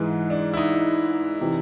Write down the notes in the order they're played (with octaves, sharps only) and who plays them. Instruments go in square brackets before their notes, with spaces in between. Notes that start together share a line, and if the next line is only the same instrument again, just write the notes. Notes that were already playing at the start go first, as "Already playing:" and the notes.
Already playing: [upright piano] G#2 E3 G#3
[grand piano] D4
E4
D#4
[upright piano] C3 E3